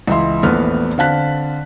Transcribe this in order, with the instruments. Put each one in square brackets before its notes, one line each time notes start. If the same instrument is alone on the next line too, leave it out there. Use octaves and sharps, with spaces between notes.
[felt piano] C#2 E3 D#5 E5 C6
A#1 E2 A3 B3 B4 F6
D3 C4 F5 A5 F#6 B6